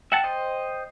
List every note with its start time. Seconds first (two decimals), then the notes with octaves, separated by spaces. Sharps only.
0.12 E5 F#5 G5 A5
0.24 C5 D#5